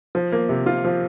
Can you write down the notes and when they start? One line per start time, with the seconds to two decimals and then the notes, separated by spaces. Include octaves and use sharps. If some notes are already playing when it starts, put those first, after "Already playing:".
0.15 F3
0.32 A#3
0.49 C3
0.66 F4
0.84 F3